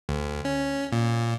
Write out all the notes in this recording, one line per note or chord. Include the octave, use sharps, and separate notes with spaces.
D2
C#4
A#2